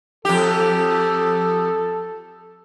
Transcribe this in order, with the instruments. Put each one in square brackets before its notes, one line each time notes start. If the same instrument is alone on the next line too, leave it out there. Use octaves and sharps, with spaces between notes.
[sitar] F2 G4 [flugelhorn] A4